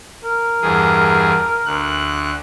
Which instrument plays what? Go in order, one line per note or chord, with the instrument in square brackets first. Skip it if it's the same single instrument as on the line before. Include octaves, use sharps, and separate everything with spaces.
[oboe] A#4
[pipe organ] E2 G2 G#4
D2 F#6